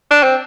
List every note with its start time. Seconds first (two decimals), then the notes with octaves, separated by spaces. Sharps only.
0.11 D4
0.23 C4